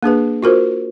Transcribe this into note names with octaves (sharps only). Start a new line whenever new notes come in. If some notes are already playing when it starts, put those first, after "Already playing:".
A#3 D4 G#4 B4
F4 F#4 A#4 C5